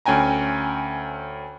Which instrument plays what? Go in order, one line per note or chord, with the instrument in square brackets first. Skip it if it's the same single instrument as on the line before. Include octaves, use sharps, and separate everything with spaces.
[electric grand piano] D2 C#4 G5 G#5 A#5